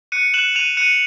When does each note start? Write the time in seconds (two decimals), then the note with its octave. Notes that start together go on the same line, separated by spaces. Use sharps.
0.12 F#6 C#7 D#7
0.34 F#6 E7 F#7
0.55 F#6 D#7 F7
0.77 F#6 C#7 D#7